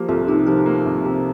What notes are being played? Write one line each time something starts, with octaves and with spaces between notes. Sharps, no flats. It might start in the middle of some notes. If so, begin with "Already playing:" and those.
Already playing: F3 A#3 G4 A#4
C2 F4 A4
C3 D#4 G4
F3 G4 A#4
A#3
C2
C3